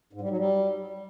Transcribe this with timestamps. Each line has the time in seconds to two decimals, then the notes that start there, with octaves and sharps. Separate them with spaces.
0.13 G#2
0.21 G3
0.29 F#3
0.37 G3